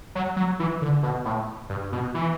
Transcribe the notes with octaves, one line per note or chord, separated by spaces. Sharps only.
F#3
F#3
E3
D3
B2
A2
G2
B2
E3